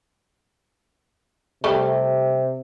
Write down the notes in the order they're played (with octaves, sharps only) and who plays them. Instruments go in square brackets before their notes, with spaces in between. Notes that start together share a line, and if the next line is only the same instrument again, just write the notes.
[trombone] C3 [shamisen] G3 A3